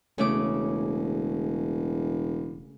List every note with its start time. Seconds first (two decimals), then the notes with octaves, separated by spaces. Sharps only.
0.18 E1 C#3 A3 D6